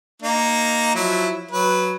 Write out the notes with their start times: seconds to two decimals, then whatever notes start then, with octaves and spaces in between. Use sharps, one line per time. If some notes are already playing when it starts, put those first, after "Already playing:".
0.22 A#3 D#4
0.95 F3 F#3 E4
1.51 F#3 B4